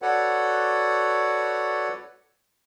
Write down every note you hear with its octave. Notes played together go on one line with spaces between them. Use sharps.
F#4 A4 B4 C#5 D5 F#5